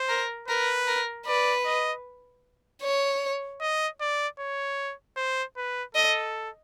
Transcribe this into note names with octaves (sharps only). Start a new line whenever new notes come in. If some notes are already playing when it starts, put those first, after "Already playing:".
Already playing: C5
A#4
A#4 B4
A#4
B4 D5
D#5
C#5
D#5
D5
C#5
C5
B4
A4 D#5